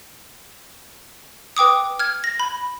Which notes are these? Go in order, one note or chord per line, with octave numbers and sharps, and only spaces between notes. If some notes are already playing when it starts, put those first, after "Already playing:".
B4 G5 D6 D#6
F6 G#6
A#6
B5